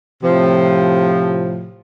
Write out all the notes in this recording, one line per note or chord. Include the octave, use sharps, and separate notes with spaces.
A2 C3 F3